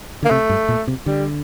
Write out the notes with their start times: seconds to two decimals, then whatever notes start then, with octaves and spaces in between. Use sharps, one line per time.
0.23 D3 A#3
0.30 C3 A3
0.49 G2
0.69 A#2
0.88 C3
1.06 D3 G3